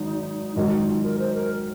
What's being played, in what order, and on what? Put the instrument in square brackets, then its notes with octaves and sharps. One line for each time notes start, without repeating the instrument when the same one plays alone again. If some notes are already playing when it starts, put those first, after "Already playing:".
Already playing: [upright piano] G#1 G#2 F#3 [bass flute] D#4
[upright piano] G#2 D#3 F#3 [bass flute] F#4
[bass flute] D#4
F4
A#4
C5
A#4